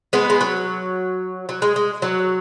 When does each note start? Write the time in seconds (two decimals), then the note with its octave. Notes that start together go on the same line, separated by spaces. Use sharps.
0.13 G#3 B3
0.30 G#3
0.41 F#3
1.49 F#3
1.62 G#3
1.76 G#3
2.02 F#3